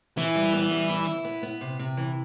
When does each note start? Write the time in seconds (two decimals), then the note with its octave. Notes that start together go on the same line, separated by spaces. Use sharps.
0.17 E3 E4
0.35 G3
0.53 B3
0.71 G3
0.89 E4
1.07 E4
1.24 B3
1.43 B3
1.61 C3
1.79 C3
1.97 E3